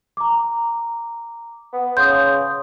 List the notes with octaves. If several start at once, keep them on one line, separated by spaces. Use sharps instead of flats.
A#5 D6
B3
C#3 C6 D#6 G6